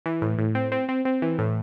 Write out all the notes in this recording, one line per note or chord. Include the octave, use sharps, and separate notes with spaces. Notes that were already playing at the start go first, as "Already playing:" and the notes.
E3
A2
A2
C4
C4
C4
C4
E3
A2